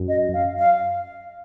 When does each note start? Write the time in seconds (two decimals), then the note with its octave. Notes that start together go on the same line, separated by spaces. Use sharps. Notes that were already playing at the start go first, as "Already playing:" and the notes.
Already playing: F#2
0.08 D#5
0.34 F5
0.59 F5